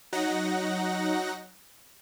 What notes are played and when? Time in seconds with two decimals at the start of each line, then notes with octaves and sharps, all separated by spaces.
0.13 F#3 D#4 F#5 A#6